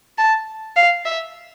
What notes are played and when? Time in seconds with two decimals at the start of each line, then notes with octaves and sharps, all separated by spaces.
0.18 A5
0.76 F5
1.05 E5